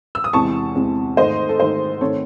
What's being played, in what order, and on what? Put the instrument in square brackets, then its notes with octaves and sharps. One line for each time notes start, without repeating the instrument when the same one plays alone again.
[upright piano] E6
D#6
E2 C3 E3 G#3 C4 A5 C#6
E2 C3 E3 G#3 C4
G#2 D#3 A3 C5 D#5
A4
G#2 D#3 A3 C5
D#3 A3 C4 A4 C#5